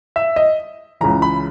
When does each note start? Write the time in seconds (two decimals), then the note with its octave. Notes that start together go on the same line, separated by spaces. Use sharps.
0.16 E5
0.36 D#5
1.01 C#2 C#3 E3 A#5
1.22 B5